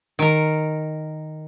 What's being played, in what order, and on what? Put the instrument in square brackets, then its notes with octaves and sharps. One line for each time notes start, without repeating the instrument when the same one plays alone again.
[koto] D#3 A#4